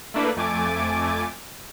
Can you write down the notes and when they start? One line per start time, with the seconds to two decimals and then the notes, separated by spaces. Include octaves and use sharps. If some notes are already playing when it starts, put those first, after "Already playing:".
0.14 A3 A#3 D4 E4 A4 B4
0.37 F2 A3 G#5 D6 A6 D7